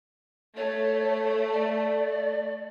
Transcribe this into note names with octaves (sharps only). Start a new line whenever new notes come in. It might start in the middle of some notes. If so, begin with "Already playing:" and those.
A3 C#5
D5